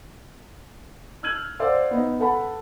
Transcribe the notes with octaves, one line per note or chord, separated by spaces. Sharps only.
E6 F6 G6 G#6 D#7 F#7
C5 D5 F5 F#5 E6
B3 D#4
A4 B4 F#5 A5 B5